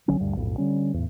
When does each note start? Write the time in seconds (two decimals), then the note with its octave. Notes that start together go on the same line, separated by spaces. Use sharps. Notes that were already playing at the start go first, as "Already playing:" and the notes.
0.08 B1 D3 F#3 C#4
0.19 D#1 D2 G2
0.36 B1 F2 A2
0.58 D3 G3 C#4
0.94 E2 A2